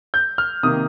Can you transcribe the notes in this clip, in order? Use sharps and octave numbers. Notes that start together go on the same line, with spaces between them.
G6
F6
C3 D#3 A#3 D#6